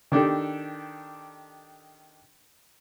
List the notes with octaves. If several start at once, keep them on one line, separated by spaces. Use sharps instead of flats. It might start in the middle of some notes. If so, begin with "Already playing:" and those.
D#3 D4 G4 A4